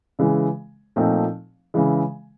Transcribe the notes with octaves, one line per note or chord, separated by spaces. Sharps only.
C#3 E3 G#3
A#2 F3 A3 C4 D#4
C#3 E3 G#3